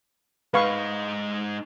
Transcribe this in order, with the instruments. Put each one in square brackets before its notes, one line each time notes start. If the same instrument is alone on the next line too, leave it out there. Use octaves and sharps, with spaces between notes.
[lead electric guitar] G#2 D#4 [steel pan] B4 F5 C#6